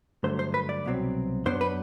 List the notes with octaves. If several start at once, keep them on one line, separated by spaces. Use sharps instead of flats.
G2 D3 F#3 A3 C5
C5
B4
D5
C2 B2 F#3 C4
F#2 F#3 B3 D4 C5
B4